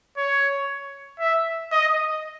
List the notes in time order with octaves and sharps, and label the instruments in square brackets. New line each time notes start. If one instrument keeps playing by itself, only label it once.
[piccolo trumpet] C#5
E5
D#5